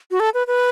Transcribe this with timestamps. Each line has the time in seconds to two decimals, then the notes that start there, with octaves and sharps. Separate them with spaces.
0.11 F#4
0.20 A4
0.34 B4
0.47 B4